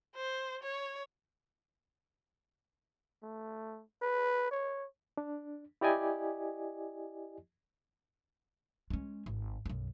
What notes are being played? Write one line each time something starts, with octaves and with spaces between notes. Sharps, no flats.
C5
C#5
A3
B4
C#5
D4
E4 G4 D5 D#5 G#5
G#3 C#4
G#1
B1 F#2